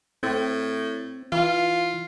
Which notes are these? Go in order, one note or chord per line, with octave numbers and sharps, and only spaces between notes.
A2 C4
E3 F4